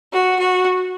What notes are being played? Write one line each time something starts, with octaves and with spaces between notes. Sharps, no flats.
F#4
F#4